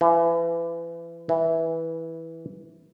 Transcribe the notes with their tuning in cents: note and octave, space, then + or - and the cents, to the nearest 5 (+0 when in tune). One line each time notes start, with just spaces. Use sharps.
E3 +30
E3 -10